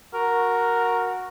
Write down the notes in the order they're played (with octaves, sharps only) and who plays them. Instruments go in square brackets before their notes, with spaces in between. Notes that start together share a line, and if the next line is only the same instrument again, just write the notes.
[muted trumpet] F#4 [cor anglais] A#4